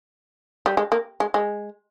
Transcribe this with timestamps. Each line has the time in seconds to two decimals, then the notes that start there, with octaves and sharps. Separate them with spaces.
0.66 G3
0.77 G#3
0.92 A#3
1.20 G#3
1.34 G#3